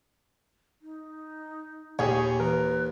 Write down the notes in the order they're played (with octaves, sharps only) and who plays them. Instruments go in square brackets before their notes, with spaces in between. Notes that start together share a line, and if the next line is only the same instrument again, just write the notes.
[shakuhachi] D#4
[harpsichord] D#2 [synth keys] A#2 [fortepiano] G4 G#4 C#5
[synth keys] E3 [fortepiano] A#4 [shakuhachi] B4